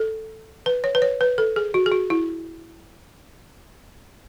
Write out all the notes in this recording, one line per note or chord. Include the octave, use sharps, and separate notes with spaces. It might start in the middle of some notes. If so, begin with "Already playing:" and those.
Already playing: A4
B4
C#5
B4
C#5
B4
A4
G#4
F#4
G#4
F#4
E4